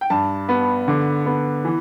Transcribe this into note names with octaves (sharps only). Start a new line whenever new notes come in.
G5
G2 A5
B3
D3
B3
E3